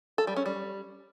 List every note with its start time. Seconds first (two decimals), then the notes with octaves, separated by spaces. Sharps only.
0.18 A4
0.27 G3
0.36 C#4
0.46 G3